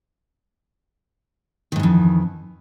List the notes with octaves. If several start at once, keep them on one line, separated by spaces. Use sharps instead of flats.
F2 G#2 D#3 E3